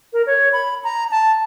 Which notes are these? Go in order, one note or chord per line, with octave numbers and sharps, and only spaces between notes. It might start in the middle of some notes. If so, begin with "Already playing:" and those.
A#4
C#5
B5
A#5
A5